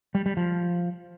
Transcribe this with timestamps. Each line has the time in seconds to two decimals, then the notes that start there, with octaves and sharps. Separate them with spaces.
0.15 G3
0.26 G3
0.37 F3